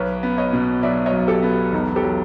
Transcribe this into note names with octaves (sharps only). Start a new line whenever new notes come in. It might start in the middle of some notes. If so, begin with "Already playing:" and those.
Already playing: B1 B4 C#5
B3
C#5 D#5
B2
F#3 D5 E5
C#5 D#5
B1
G4 A4
B3
E1 D#4
G4 A4
F#3